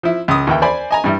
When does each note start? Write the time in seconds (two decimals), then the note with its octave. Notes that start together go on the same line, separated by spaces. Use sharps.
0.03 F3 E4
0.28 C#2 D#6
0.47 D#2 E3 G5
0.62 C5 D5 G#5 B5
0.91 D#5 G#5 A#5
1.04 G2 G3 E4